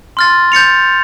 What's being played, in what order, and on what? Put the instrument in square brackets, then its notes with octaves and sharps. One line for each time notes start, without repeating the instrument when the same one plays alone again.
[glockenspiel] C6 F6 A6
G6 A6 C#7 F7